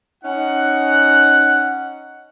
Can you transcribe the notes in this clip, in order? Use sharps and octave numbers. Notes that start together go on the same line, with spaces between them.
C#4 D#4 F#5